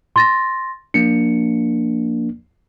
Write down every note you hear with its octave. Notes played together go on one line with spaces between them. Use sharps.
C6 A6 A#6
F3 A#3 D4 C#7